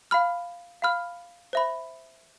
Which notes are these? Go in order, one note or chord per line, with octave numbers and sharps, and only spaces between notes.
F5 B5 F6
F5 B5 F6
C5 E5 B5